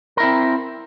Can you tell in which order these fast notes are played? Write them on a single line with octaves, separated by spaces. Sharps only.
A#4 E4 C4